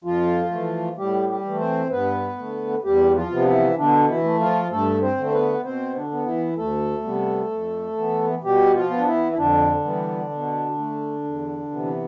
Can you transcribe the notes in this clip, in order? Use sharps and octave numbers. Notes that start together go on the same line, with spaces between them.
F2 F3 F4
E3 A3
A2 G3 G4
G3 G4
E3 A3
C4 C5
G2 B3 B4
D3 A3
E2 G3 G4
F3 F4
C3 F3 B3
D4
E3 E4
B2 D3 D4
E3 E4
A3
F3 F4
G2 A3 A4
C4 C5
D3 A3
C5
B3 B4
B2 C4 C5
D3 D4
B3
E3 E4
D2 A3 A4
C3 G3 B3
F2
E3 B3
B2 G3 G4
F3 F4
B3
D4
E3 E4
E4
F2 D3 D4
E3 G3 B3
B2
A3
E2
C3 E3 B3